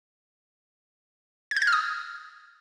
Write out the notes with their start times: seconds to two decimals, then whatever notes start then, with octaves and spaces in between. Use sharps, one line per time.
1.51 G#6
1.57 G6
1.62 G#6
1.67 F6
1.72 D#6